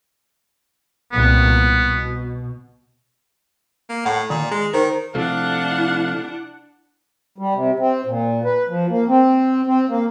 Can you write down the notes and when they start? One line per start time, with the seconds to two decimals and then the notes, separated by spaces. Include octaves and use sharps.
1.12 C2 A#2 B3
1.64 B2
3.89 A#3
4.05 A2 F#5
4.30 A#2 D#3
4.51 G#3
4.74 D#3 A#4 C5
5.15 C3 F3 A3 D4 E4 F5 F#5
7.38 G3
7.55 C3
7.80 C4
8.07 A#2
8.45 B4
8.68 F3
8.90 A#3
9.08 C4
9.67 C4
9.89 A#3